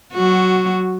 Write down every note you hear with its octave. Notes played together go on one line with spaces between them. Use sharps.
F#3 F#4